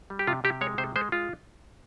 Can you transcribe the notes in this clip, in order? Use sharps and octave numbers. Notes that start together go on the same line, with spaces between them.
G3
G4
C3 F4
C3 G4
G#3 C#5
C3 C5
G#3 C5
G#3 F4